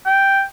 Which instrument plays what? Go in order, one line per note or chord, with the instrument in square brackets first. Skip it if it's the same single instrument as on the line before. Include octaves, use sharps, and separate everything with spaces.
[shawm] G5